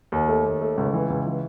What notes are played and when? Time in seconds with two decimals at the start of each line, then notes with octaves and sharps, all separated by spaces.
0.12 D#2
0.28 A3
0.45 D#2
0.61 A3
0.77 C#2
0.93 E3
1.10 C#2
1.26 E3